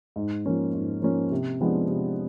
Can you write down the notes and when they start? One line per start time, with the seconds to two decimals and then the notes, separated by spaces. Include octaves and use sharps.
0.16 G#2
0.46 F3 A#3 C#4
0.74 G#2
1.02 F3 A#3 C#4
1.31 C3
1.61 F3 G#3 B3 D4
1.89 C3